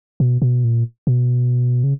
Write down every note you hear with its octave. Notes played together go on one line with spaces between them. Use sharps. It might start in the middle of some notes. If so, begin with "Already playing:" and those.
B2
B2
A#2
B2
C#3